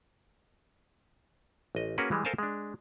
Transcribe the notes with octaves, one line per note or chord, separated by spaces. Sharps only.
A1 D#5
A#3 C#4 F#4 G#4 A#4 B4
E3 G3 G#3
A4 A#4 C5 F5 G#5 A5
G#3 D4